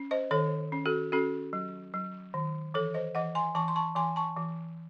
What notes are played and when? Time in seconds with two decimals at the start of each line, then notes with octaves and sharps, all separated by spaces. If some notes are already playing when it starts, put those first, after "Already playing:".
Already playing: C#4
0.11 C5 D#5
0.31 D#3 A4 C#5
0.72 C#4
0.86 F#4 A4
1.12 C#4 F#4 A4
1.53 F#3
1.94 F#3
2.34 D#3
2.74 E3 A4 C#5
2.94 C5 D#5
3.15 E3 D#5 F#5
3.35 G#5 C6
3.55 E3 A5 C#6
3.68 C6
3.76 A5 C#6
3.96 E3 G#5 C6
4.16 A5 C#6
4.37 E3